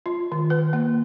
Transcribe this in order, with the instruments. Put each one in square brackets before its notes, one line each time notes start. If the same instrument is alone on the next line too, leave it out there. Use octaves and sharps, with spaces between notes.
[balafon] F4
D#3
B4
A#3